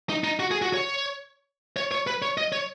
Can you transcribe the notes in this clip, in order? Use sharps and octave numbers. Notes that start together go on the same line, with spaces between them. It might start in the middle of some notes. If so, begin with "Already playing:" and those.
D#4
D#4
F#4
G#4
F#4
C#5
C#5
C#5
B4
C#5
D#5
C#5